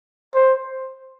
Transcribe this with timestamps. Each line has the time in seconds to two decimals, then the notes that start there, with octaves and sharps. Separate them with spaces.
0.35 C5